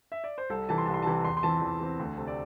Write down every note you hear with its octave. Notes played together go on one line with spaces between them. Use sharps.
E5
D5
C5
C2 A4
C3 E3 A5
C6
C2 A5
C6
C3 E3 A5
E2 C6
C6
E3 C4 A5
E2
E3 C4
D2
C3 A3 C4
D5